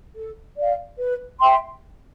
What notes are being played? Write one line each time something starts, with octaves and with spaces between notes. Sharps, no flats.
A4
D5 F5
B4
E5 G5 C6